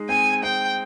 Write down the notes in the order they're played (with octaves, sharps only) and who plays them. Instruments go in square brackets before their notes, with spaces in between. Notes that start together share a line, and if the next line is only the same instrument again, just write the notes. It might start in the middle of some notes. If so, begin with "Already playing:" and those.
Already playing: [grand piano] G#3 D#4
[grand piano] C4 [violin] G#5
[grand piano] C4 [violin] G5